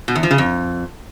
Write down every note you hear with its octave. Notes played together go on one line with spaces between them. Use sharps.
B2
E2
F3
C#3
F2